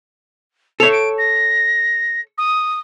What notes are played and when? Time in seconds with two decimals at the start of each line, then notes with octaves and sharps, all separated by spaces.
0.80 A4 C#5 F7
0.92 D7
1.18 A#6
2.38 D#6